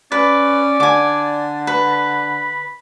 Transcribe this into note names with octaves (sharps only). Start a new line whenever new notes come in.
C#4 B4 D5
D3 G#5 D6
B4
B5